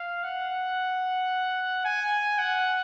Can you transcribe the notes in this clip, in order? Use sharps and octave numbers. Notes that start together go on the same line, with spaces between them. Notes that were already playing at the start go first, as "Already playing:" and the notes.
Already playing: F5
F#5
G#5
F#5